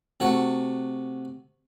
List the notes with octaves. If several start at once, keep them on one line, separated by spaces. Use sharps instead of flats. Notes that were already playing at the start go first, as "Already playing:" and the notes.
C3 A3 F#4 F#5